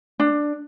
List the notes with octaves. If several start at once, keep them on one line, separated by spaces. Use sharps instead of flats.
D4